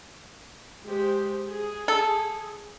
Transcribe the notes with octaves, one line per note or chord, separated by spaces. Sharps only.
G#3 G4 C5
G#4
A4